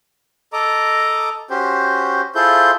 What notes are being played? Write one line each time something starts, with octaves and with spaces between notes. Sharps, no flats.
A4 D#5 A#5 D6
C#4 F#4 G4 C5
E4 F4 G#4 A4 C5 G6